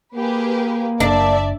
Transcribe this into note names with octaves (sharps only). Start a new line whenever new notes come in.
A#3 G4 G#4 B4
F#1 D4 D5 E5